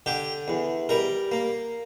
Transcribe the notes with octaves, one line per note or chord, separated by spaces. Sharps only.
D3 G4
E2
G3 A#4
A#3